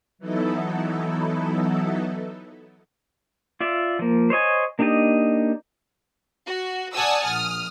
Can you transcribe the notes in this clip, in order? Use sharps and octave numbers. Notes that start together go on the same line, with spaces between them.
E3 F#3 B3 D#4 E4 A4
F4 D5 E5
F3 A#3
C5 C#5 D#5 G#5
A#3 D4 D#4 G4 D#5
F#4
D5 F#5 G#5 A5 D#6 E6
A#1 D#6 F6